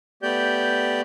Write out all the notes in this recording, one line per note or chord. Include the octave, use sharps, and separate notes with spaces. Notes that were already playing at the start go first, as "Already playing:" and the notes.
A3 B3 G4 D5 G6